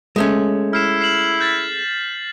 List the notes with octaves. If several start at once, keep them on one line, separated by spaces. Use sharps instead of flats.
G#3 A3 C#4
E4 F6 C7 E7
C7 E7 F#7
G6 A6 B6